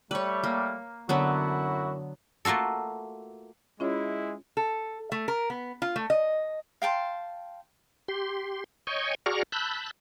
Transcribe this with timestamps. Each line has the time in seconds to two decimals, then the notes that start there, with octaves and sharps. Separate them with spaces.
0.11 G3 A3 B4 C#5
0.44 A#3
1.09 F#2 D3 F#3 B3 E4 F#4
2.45 A3 A#3 F4 F#4 A4
3.80 G#3 C#4 E4 F4 C#5
4.57 A4
5.12 A3
5.28 A#4
5.50 B3
5.82 F4
5.96 A3
6.10 D#5
6.82 F5 G5 A5 C6
8.08 G4 C6
8.87 C#5 D#5 G5 G#5 C#6
9.26 F#4 G#4 D5 A#5 C#6 F6
9.52 A5 B5 E6 F#6 G6